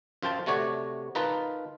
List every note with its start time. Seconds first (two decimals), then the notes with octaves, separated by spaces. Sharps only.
0.22 F#2 F4 C5 G5 A5
0.46 C3 A3 F#4 C#5 D5
1.15 D#4 F4 A#4 B4 A5